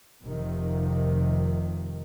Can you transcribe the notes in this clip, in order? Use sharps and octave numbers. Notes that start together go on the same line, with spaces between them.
F1 C3 D#3 F3